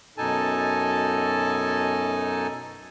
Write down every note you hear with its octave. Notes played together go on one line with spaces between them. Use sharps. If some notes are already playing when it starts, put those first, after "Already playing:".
F#2 B2 D#4 A4 G#5 A5